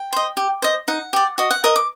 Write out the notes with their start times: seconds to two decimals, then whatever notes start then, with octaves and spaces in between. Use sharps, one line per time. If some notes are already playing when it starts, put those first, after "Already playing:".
Already playing: G5
0.13 C5 D#5
0.37 G4
0.62 C5 D#5
0.88 D#4 F#5
1.13 G4 D5
1.38 F#4 D#5
1.51 F#5
1.64 A#4 D#5 D#6
1.76 D6